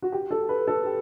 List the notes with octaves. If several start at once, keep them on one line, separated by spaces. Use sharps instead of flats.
F#4
G4
A4
B4
A4
G4